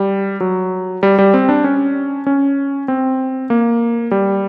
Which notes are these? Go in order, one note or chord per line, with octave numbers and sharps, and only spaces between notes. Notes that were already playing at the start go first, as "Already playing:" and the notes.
Already playing: G3
F#3
G3
G3
C4
D4
C#4
C#4
C4
A#3
G3